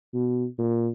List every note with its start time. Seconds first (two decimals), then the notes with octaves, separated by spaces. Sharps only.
0.14 B2
0.59 A#2